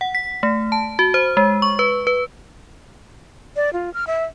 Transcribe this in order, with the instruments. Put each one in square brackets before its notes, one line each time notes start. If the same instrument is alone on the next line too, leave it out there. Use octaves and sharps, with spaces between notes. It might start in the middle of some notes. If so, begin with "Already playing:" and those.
[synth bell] F#5
B6
A3
A5
F#4
C5
G#3
C#6
B4
B4
[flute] D5
F4
F6
E5